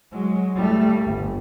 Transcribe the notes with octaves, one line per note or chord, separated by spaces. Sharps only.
F#3 G#3
G3 A3
G1